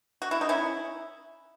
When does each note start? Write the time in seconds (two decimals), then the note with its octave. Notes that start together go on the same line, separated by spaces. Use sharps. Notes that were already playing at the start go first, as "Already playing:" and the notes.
0.22 F#4
0.31 E4
0.41 D#4
0.49 C#4 E4